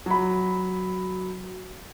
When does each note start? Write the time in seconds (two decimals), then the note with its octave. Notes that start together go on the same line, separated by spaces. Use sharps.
0.06 F#3 B5